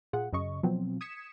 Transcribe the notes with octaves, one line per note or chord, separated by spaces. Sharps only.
A#2 F4 G#4 F#5
F#2 C#3 D#5 C#6
B2 F3 F#3 C4
D#6 G#6 B6 C#7 E7